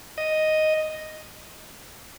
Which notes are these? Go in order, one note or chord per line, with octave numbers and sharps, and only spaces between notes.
D#5